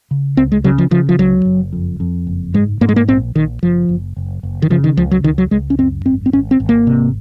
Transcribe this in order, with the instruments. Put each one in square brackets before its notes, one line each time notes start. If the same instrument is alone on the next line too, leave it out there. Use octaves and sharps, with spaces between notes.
[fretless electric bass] C#3
C#2 C4
G#3
C#3 F#3
F3
C#3 F3
F3
C#2 F#3
F#1
F2
F2
F#1
G#2 G#3
G#2 A#3
G#3
A#3
A#1 C4
A#1 D#3
F#1 F3
F#1
F#1
F#1
D#3
C#3 F3
D#3
C#2 F3
F#3
C#2 D#3
F#3
C#2 G#3
C#4
F#2 C4
G#1 C4
C4
G#1 C#4
C4
G#1
A#3
C3